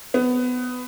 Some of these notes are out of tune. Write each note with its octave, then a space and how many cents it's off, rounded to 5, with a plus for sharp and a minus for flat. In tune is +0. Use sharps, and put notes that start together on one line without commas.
B3 +15